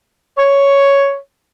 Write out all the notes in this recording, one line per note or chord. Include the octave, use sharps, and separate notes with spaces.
C#5